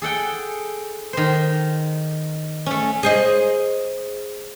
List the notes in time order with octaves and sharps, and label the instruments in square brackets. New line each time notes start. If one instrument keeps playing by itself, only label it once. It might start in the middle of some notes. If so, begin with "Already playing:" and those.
[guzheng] G#4 A4 F#5 G5
D#3 C5
A3 C#4
[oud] G#4 C5 D#5